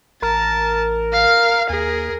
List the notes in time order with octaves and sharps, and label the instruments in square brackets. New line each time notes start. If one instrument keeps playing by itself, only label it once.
[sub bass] A1 [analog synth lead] A#4 [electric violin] A5
[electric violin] F5 F6
[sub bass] D#2 [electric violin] G#4 A#4